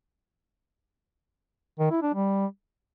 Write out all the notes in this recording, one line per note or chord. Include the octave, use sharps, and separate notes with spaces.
D#3
E4
D4
G3